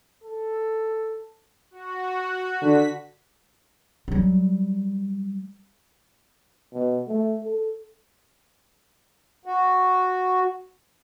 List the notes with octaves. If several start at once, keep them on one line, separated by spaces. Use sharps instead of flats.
A4
F#4
D3 B6
F#3 G3
B2
A3
A4
F#4